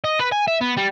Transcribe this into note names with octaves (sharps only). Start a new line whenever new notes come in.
D#5
B4
G#5
E5
B3
G3